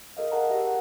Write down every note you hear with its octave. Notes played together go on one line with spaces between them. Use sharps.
G#4 A#4 D#5 F5
A#4 F#5 A5 A#5
G4 A#4 E5
G4 F#5